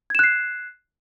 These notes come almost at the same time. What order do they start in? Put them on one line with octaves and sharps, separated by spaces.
G#6 E7 F#6 C7